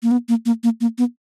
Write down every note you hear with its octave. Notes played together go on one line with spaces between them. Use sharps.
A#3
B3
A#3
A#3
A#3
A#3
B3